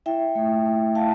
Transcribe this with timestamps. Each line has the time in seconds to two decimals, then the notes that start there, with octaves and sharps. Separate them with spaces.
0.06 E4 E5 G5
0.35 A3
0.65 A3
0.95 E4 F5 A5